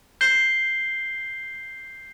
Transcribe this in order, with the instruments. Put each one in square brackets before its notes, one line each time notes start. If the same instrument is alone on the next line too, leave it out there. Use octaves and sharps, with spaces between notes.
[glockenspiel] G6 C7 G7